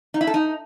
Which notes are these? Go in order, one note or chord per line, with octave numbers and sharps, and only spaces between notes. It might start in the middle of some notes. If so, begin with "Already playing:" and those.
D#4
E4
A4
D#4